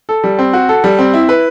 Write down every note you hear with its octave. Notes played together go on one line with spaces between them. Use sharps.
A4
G3
C4
F#4
A4
G3
C4
E4
B4